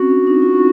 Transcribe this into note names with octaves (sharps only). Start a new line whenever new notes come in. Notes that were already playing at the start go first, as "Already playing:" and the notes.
Already playing: C4 C#4 F#4
D4
D#4
F4